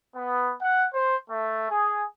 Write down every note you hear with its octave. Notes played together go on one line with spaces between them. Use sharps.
B3
F#5
C5
A3
G#4